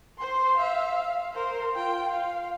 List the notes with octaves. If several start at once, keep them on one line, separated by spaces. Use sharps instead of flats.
C5 C6
E5 F5
F5
A#4 C5
F4 G5
F5